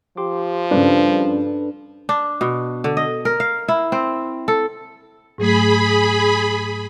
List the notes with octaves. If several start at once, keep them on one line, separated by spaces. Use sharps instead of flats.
F3 G4 C6 D6
G2 C#3 D4 A4 B4
D4
B2
D3
D#5
A#4
F5
E4
C4
A4
G#2 F#3 A3 G#4 B5